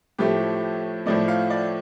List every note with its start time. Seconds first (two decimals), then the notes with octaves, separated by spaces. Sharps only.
0.19 A2 F3 A3 G4
1.06 A2 F3 A3 D5
1.28 F5
1.50 D5